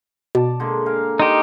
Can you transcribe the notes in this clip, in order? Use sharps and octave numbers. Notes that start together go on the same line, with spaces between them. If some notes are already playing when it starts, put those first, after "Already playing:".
B2 D5 A5
D3 G#3 A#3
A#4 F5 G#5
D#4 G4 C6